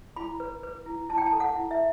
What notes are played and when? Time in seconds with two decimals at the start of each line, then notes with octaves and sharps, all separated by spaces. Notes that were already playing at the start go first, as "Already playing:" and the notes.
0.16 E4 B5
0.40 B4
0.63 B4
0.86 E4
1.09 E4 A5
1.18 G5
1.26 A5
1.33 A4
1.40 F#5
1.56 E4
1.71 E5